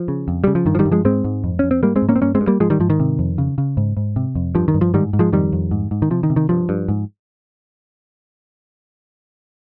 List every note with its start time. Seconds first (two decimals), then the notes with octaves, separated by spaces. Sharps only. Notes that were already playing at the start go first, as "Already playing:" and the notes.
Already playing: F3
0.08 C#3
0.28 F2
0.44 C#3 G3
0.55 F3
0.66 G2 D#3
0.75 F3
0.79 D#3 G3
0.85 G2
0.92 F3 G#3
1.05 G#2 G#3 C4
1.24 G#2
1.44 F2
1.59 F2 C#4
1.71 C4
1.83 G#2 G3 A#3
1.96 G#3 C4
2.02 G#2
2.09 A#3 C#4
2.16 C4
2.21 G2 A#3 C#4
2.35 G#3 C4
2.41 G2
2.47 G3 A#3
2.60 G#2 F3 G#3
2.70 D#3 G3
2.80 G#2 F3
2.90 D#3
3.00 C3
3.19 F2
3.38 C#3
3.58 C#3
3.77 G#2
3.97 G#2
4.16 C3
4.35 F2
4.55 G2 F3
4.68 D#3
4.74 G2
4.81 F3
4.94 G#2 D#3 G3
5.13 G#2
5.19 F3 G#3
5.32 F2 D#3 G3
5.52 F2
5.71 G#2
5.91 G#2
6.02 D#3
6.10 C3 F3
6.23 D#3
6.30 C3
6.36 D#3
6.49 G2 F3
6.69 G2
6.89 G#2